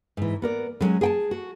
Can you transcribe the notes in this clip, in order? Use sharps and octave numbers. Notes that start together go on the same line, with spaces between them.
G#2 E3
B3 A#4 D5
D3 F#3 G#3 C#4
G#4 G5 A5
F#4